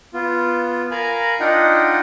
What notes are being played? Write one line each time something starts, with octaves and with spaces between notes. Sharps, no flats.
B3 F4
A#4 F5 G#5 A#5 B5
D4 D#4 F4 D#5 F#5 G5